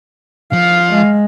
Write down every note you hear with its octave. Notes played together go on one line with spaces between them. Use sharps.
F3 F5
G#3